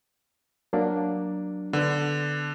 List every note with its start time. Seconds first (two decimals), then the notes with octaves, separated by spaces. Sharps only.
0.73 F#3 A#3 D4
1.73 D3 B3